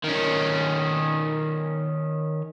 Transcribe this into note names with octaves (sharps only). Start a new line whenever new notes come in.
D#3 C#4